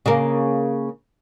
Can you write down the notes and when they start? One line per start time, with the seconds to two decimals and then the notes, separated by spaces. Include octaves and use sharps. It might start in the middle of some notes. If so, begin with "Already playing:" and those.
0.06 C#3 A#3